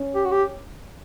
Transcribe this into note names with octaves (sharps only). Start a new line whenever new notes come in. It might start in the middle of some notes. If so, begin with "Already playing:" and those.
Already playing: C#4
G4
F#4
G4